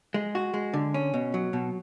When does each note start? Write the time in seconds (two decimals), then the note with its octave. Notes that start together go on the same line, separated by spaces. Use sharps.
0.14 G#3
0.35 F#4
0.54 G#3
0.74 D3
0.94 C#4
1.14 B2
1.34 F#3
1.53 B2